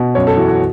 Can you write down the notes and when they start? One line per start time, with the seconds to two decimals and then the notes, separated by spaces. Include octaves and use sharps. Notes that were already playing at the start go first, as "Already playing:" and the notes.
Already playing: B2
0.15 F#2 C#5
0.27 A4
0.37 E3 F#4
0.48 F#4